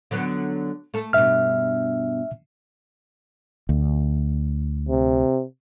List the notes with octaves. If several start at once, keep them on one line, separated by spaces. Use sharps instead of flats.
D3 F#3 B3
A3 A4
G2 B2 E5 F6
D2
C3